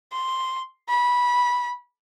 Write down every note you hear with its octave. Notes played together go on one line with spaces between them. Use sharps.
C6
B5